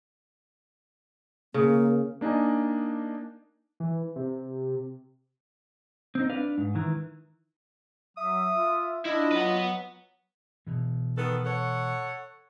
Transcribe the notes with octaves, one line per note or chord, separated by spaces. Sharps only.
C#3 A#3
A#3 D4 D#4 D#5 G#5
E3
C3
C4 D#4
D4 B4 F5
G#2
D#3 E3
F#3 E5 D#6
F4
D4 E4 F4 D#5
F#3 B4 F#5
B2 E3
D#3 B3 A4
A4 C#5 F#5